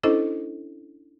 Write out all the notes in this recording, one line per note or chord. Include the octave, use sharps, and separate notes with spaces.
C#4 D4 E4 A4 C5 D#5